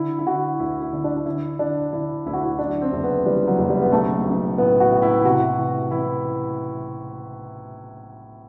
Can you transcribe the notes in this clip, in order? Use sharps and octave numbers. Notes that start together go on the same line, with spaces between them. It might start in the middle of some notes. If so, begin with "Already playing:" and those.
Already playing: D3 E4
E4
D3 F#4
D2 E4
E4
D3
D4
D4
D3 E4
D3 D4
D3 E4
D2 E4
F#4
E4
F#2 D4
C4
F#1
B3
E3 G3
F#3
F#1
G3
B3
B1 A3
B1
A2 B3
F#4
A2
E4
C3 F#4
E3
E3 E4